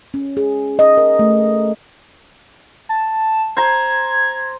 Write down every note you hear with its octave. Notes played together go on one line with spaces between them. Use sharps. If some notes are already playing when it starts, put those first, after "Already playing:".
C#4
G#4
D#5
A#4
A3
A5
C5 A#5 G#6